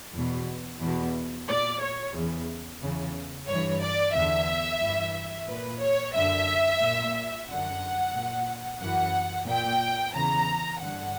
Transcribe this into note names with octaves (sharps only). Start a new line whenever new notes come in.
E2 B2
E2 B2
A#2 D5
C#5
E2 C#3 E3
E2 C#3 E3
G2 E3 C#5
D5
E2 D3 E5
G2 E3
A#2 B4
C#5
F#2 D3 E5
A#2
F#2 D3 F#5
A#2
F#2 E3 F#5
A#2 G5
E2 C#3 E3 A#5
G2 D3 F#5